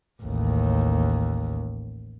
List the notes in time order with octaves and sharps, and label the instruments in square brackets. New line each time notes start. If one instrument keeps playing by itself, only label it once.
[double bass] A1 D#2